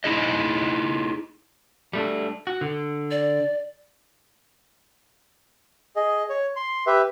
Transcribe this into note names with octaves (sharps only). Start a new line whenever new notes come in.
D#4 E4 G#4 D#5
G3 A3 D4
F#4
D3
D5
G#4 D#5
C#5
C6
G4 B4 E5